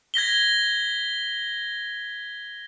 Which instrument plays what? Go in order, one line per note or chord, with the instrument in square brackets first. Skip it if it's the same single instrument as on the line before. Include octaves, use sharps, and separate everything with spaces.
[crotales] G#6 A#6 B6 G7